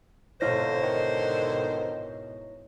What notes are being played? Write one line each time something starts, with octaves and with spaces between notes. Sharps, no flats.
F2 G#2 B2 D3 E4 C5 C#5 A#6
D#3